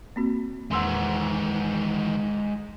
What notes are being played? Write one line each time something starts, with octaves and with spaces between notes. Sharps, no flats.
A#3 C4 F#4
E2 D#3 E3 G#3 F#5 C6 E6